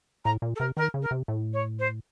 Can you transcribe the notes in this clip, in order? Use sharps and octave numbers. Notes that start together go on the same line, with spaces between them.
A2 A#5
A#2
A4
C3 A#4
D#3 A#4
C#3
A#4
C3
A2
C#5
C5